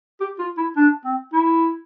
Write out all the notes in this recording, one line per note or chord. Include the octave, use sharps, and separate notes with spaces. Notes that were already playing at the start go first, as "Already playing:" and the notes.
G4
F4
E4
D4
C4
E4